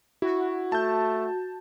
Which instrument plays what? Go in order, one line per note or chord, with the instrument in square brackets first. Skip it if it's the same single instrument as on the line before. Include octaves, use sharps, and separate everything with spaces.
[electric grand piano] E4 [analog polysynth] F#4
[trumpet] A3 [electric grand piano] A5 G6